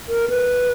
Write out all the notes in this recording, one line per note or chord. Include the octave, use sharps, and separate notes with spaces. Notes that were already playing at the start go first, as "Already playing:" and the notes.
A#4
B4